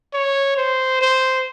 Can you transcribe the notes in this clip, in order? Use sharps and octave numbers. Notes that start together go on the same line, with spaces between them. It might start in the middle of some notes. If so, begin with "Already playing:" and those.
C#5
C5
C5